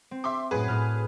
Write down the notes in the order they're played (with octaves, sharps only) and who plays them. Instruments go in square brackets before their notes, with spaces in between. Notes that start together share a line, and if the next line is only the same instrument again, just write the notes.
[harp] C4
[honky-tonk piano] E5 C6 D6
[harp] F#2 A2 [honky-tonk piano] G#4 B4
[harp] A2 F6